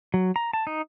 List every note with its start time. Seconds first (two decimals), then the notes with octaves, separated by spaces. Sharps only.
0.14 F#3
0.36 A#5
0.53 A5
0.67 D#4